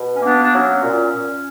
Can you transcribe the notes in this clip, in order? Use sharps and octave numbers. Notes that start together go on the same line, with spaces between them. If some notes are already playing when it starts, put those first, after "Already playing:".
Already playing: B2
C#4
A#3 B3 D4
D4
F#3 C#4
A#2